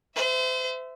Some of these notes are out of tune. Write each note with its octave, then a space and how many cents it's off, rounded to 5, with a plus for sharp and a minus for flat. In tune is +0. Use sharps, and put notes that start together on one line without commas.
C5 -35 E5 +0